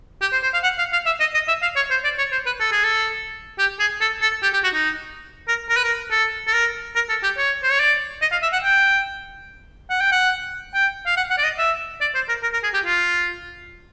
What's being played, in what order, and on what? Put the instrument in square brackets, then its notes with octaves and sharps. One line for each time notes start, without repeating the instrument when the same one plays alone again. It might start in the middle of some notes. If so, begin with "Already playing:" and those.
[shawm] G4
C5
C5
F5
F#5
F5
F5
E5
D#5
D#5
E5
F5
C#5
C5
D5
C#5
C5
B4
A4
G#4
A4
G4
G#4
A4
A4
G4
G4
F#4
D#4
A#4
A#4
B4
A#4
A4
A4
A#4
A#4
A4
G4
C#5
C5
C#5
D5
D#5
F5
E5
F#5
G5
F#5
G5
F#5
G5
F5
F#5
F#5
D5
D#5
E5
D5
C5
A#4
A#4
A#4
G#4
G4
F4